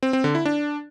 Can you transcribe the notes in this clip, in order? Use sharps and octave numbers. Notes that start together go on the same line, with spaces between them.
C4
C4
D3
E4
D4